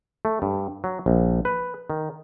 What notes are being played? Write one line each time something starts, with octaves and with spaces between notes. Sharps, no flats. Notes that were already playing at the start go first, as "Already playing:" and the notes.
A3
G2
F#3
A#1
B4
D#3